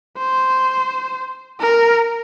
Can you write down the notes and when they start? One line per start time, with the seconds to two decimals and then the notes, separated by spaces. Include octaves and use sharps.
0.18 C5
1.60 A#4